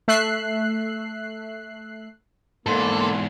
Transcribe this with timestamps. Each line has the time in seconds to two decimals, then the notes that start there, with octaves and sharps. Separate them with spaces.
0.08 A3 E5 F#6 C7
2.66 E2 G#2 A#3 A4 C6